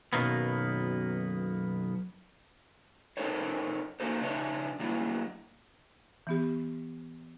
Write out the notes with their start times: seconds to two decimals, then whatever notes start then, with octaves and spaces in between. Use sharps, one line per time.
0.13 B1 F#2 B2 D#3 A#3 B3
3.17 C4 D#4 A4 A#4 C5 C#5
4.00 A#3 D#4 F#4 A4 C5
4.21 C#3 D4 D#4 B4 C#5 E5
4.79 D#3 F#3 G3 A#3 E4
6.27 E3 B3 G4